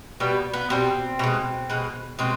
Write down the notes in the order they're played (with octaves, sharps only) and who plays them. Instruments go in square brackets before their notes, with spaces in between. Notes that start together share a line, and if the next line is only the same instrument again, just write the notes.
[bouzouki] B2 G3 B3
B3
B2 G3 C4
B2 G#3
B2 G#3
B2 G#3 C4